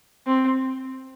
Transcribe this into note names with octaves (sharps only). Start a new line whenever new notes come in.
C4